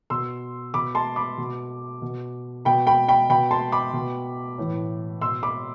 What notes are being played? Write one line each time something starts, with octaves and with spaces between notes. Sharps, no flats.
B2 C6 E6
B2 B5 D6
A5 C6
B5 D6
B2
B2
B2 G5 B5
G5 B5
G5 B5
B2 G5 B5
A5 C6
B5 D6
B2
A2 E3
B2 C6 E6
B5 D6